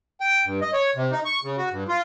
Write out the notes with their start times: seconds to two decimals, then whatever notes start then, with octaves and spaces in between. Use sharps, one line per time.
0.21 G5
0.45 G2
0.61 D#5
0.73 C#5
0.96 C3
1.12 D#4
1.25 C#6
1.44 C#3
1.58 F#4
1.72 G2
1.88 F4